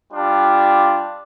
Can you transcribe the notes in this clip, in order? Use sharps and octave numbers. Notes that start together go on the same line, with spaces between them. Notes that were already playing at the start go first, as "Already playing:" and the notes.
G3 D4 F4